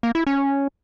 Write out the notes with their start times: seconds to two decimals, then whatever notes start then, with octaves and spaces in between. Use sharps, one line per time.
0.03 A#3
0.15 E4
0.27 C#4